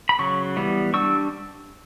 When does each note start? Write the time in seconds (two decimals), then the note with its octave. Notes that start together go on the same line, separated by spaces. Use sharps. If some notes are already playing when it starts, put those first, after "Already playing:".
0.09 B5
0.19 C#3 F#3 C#6
0.56 E3 G3 B3
0.94 G3 D4 C#6 E6